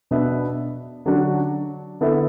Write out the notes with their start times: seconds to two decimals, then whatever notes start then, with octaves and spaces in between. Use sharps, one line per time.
0.11 B2 B3 D4 B4 E5
1.06 D3 F#3 D4 F#4
2.01 D3 B3 E4 A4 E5